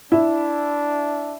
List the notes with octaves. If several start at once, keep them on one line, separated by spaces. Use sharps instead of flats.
D4 E4